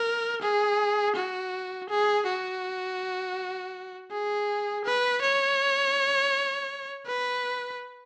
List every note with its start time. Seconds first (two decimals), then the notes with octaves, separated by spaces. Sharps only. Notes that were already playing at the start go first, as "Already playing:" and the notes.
Already playing: A#4
0.42 G#4
1.16 F#4
1.89 G#4
2.27 F#4
4.11 G#4
4.85 B4
5.22 C#5
7.07 B4